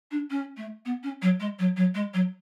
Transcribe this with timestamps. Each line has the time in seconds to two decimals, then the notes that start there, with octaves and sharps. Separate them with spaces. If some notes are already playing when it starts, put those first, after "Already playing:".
0.11 D4
0.30 C#4
0.57 A3
0.85 B3
1.03 C#4
1.22 F#3
1.40 G#3
1.59 F#3
1.76 F#3
1.94 G#3
2.14 F#3